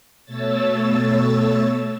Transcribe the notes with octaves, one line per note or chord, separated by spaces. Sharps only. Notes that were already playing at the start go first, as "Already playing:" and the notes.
B2 A3 C#5 E6 A6